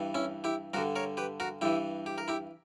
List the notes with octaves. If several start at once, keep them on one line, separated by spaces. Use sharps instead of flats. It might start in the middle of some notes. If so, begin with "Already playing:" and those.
Already playing: G2 E3
C#4 E4
E4 G4
G2 D3 F#4 A#4
A#4 C#5
G4 B4
F#4 A#4
G2 E3 E4 G4
G4
A#4
E4 G4